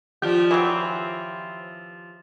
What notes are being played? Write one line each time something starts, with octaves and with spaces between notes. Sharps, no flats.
D#3 F3 F4 G4 D5
E3 F#3 C4